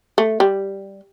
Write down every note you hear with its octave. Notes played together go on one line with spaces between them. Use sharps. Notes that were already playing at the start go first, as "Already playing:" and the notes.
A3
G3